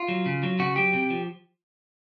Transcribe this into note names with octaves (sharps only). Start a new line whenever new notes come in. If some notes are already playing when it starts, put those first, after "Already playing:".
Already playing: F4
F#3
C#3
F#3
C#3 F#4
F#3 G4
C3
F3